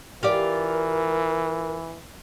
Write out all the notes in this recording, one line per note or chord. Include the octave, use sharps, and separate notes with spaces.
E3 F4 G4 A#4 D5